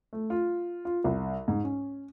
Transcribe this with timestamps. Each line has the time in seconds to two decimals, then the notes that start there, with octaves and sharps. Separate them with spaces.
0.13 A3
0.30 F4
0.85 F4
1.04 C2
1.48 G#2
1.64 C#4